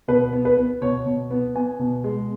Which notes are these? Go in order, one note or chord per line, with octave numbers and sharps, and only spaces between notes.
B2 B4
B3
B4
B3
B2 C#5
B2
B3
B3 G#5
B2
G#3